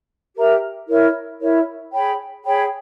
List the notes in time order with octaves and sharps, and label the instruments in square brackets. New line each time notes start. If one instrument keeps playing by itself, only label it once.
[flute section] G4 A#4 E5 A#5
E4 A#4 C#5 E5
E4 A#4 C#5 E5
G#4 C#5 G5 B5
G#4 C#5 G5 B5